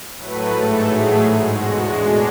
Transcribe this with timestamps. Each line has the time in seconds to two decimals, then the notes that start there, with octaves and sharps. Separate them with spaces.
0.16 A2 F#3 A3 B4
0.50 G#2 E3 A3 A4
0.84 A2 F#3 A3 G#4
1.18 G#2 G#3 F#4
1.53 E2 B2 G#3 F#4
1.87 A2 G#3 D4